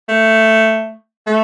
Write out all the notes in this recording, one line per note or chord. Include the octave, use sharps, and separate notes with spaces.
A3
A3